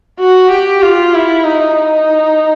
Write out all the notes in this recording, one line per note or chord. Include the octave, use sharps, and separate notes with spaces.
F#4
G4
F4
E4
D#4
D#4